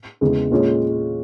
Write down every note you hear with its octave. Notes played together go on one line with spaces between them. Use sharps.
E2 C#3 E3 G#3
A#2 G#3 C#4 F4